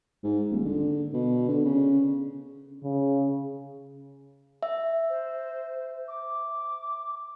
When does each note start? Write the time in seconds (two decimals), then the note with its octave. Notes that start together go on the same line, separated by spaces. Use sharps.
0.24 G#2
0.51 D#1
0.65 D3
1.14 B2
1.48 D3
1.65 C#3
2.83 C#3
4.63 E5
5.10 C5
6.08 D6